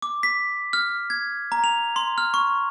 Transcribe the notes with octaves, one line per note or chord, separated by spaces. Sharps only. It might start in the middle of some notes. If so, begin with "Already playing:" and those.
D6
B6
F6
G#6
A#5
F7
C6
F6
C#6